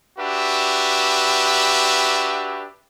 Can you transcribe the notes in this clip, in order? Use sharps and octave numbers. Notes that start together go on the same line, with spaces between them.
D4 F#4 G4 B4 E5